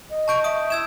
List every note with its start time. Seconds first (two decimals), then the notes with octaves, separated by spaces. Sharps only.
0.10 D#5
0.28 A5 C#6 G6 D7
0.44 E5 D#6 D7
0.70 E4 E6 G#6 E7